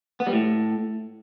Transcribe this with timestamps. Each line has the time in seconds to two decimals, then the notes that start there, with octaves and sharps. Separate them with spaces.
0.20 B3
0.27 G3
0.33 A2